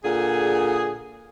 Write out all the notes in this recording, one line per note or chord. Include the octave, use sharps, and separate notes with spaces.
A#2 D3 G#4